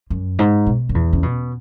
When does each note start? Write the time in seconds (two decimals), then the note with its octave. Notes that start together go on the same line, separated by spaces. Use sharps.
0.10 F#2
0.39 G#2
0.66 B2
0.89 F#2
0.95 E2
1.13 C#3
1.23 B2